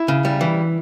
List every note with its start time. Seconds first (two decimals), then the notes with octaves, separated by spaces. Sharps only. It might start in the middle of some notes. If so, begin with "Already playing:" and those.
Already playing: E4
0.08 C#3
0.25 G3
0.41 E3